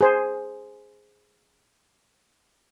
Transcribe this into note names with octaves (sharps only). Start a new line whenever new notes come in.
G#4 C5